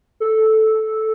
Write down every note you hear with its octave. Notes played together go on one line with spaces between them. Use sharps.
A4